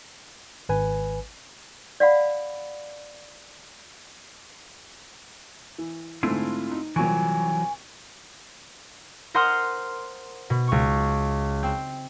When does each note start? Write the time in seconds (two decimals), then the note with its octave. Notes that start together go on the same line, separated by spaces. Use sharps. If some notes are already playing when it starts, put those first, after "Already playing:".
0.69 G#1 B4 G#5
2.00 D5 F5 F#5 B5
5.78 E3
6.23 G#2 D3 A3 C4 E4 F4
6.71 D#4
6.96 C2 A#2 E3 F#3 G#5 C#6
9.34 A#4 C5 F#5 C6 D#6 F6
10.50 B2
10.67 C#2 C#6
11.63 C4